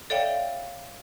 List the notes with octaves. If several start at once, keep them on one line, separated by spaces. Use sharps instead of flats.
A4 C#5 D5 E5 F5 G5